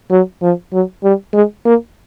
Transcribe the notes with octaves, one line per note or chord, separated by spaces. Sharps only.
F#3
F3
F#3
G3
G#3
A#3